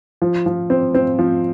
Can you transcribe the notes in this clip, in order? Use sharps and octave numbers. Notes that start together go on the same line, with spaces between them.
F3
F3
C4
C4
F3